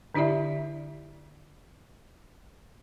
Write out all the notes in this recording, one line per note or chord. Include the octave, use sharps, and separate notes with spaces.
D3 D4 E4 G4 D5 E5